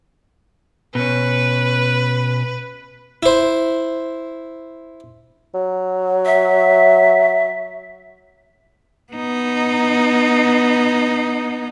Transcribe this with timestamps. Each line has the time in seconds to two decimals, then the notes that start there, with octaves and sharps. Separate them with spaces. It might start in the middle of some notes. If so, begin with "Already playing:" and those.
0.95 B2 C#4 B4
3.23 E4 C5
5.54 F#3
6.26 E5
9.13 B3 D#4